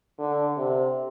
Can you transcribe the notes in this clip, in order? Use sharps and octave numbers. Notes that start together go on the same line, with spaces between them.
D3
C3